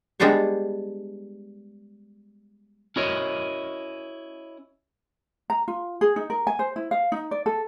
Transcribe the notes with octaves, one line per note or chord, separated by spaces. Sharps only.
G3 G#3 B3 D4 C5 C#5
C#4 E4 F#4 A#4 C#5 D#5
A#5
F4
G#4
D#4
A#4
G#5
C5
E4
F5
D#4
D5
A4